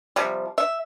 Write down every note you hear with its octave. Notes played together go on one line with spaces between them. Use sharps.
C3 F3 G3
E5